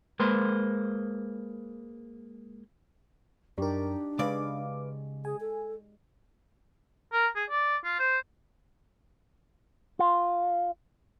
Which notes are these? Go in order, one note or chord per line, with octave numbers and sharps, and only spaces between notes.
G#3 A#3 B4 C5
F#2 D4 D#4 G4 A#4 D5
C#3 G#3 B4 D5 F5 D6
G#4 G#5
A4
A#4
G#4
D5
F4
C5
F4